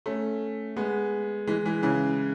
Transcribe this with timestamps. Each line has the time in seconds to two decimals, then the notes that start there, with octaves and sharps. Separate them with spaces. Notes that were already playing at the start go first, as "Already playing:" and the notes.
0.06 A3 C#4
0.76 G#3 B3
1.47 E3 G#3
1.65 E3 G#3
1.83 C#3 E3